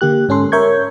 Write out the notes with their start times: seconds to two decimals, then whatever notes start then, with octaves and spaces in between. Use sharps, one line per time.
0.01 D3 A#3 G4 F#6
0.29 G#2 C#4 A4 C6
0.52 A#4 C#5 E5 C#6 G6 G#6